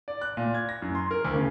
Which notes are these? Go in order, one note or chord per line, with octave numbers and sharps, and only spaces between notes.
D5
F#6
A#2
G#6
A#6
F#2
C6
A#4
D2
C#3